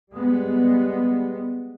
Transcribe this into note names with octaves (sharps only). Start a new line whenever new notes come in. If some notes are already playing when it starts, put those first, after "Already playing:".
G3 G#3 B3